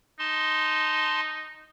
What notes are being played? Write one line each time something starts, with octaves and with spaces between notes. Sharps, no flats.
D#4 A5 C6